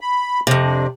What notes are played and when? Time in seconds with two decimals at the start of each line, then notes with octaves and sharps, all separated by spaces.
0.01 B5
0.47 F2 C3
0.64 D4